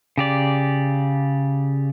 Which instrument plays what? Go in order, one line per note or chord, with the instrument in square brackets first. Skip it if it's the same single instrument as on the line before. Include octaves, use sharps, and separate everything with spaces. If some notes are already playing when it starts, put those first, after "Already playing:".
[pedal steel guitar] C#3 G4 D5